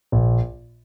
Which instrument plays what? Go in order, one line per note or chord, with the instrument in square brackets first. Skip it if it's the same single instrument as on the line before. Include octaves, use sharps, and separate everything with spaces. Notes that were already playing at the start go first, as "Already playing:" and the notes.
[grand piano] A#1